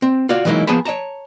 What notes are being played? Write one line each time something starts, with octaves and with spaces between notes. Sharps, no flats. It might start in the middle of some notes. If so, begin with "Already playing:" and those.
C4
F4 F#4 D5 F5
E3 F#3 G#3 A#3 D#4 E4
F3 B3 G#4 C5 A5 B5
C#5 D#5 A5 A#5